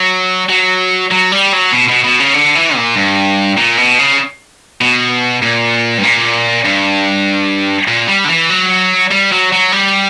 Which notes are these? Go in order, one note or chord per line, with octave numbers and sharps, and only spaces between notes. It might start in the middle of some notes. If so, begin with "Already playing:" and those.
Already playing: F#3
F#3
F#3
G3
F#3
B2
B2
B2
C#3
D3
E3
A#2
G2
A#2
B2
C#3
B2
A#2
G2
A#2
G2
A#2
G3
D3
E3
F#3
G3
F#3
F#3
G3